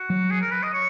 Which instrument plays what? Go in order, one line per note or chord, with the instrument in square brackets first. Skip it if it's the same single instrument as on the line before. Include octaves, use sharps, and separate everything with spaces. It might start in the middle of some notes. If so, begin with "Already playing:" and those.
Already playing: [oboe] F#4
[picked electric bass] F#3
[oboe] G#4
A#4
B4
D#5
C#5